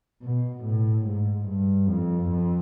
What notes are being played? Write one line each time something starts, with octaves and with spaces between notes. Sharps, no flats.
B2
A2
G#2
G2
F2
F2